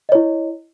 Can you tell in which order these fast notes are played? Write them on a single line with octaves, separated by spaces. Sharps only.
D#5 C#5 E4